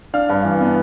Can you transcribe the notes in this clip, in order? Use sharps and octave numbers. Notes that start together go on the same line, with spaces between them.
D4 F5 F6
G2
E3
B3